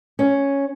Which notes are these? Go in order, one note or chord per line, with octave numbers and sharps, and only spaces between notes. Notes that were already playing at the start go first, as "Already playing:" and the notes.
C#4